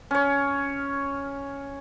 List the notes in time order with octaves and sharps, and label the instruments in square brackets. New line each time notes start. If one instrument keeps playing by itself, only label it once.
[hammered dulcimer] C#4 C#5